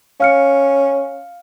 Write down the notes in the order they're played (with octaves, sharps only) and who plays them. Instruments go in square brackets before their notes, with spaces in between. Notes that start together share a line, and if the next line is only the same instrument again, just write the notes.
[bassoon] C#4 [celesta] F5 F6 C#7